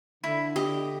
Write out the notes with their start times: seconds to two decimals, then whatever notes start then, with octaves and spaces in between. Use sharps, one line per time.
0.24 D3 E4
0.56 G4 D#5